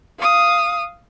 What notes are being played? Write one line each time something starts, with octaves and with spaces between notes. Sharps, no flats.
F5 D#6